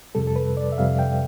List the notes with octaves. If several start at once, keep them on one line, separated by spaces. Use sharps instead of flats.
F2 C3 G3 A4
A4
B4
D5
E5
F2 C3 G3 F5
G5